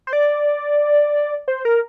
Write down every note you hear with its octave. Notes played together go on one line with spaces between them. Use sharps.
C5
D5
C5
A#4